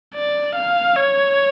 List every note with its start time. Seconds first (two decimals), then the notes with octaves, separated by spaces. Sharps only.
0.15 D5
0.56 F5
0.96 C#5